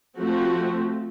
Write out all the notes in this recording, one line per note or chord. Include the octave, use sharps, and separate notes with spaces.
F3 A3 C4 F#4